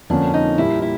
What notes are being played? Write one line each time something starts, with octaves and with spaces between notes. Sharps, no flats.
F2 D3 F3 A#3 C#4 D4
D#4
A#2 G3 A#3 E4
E4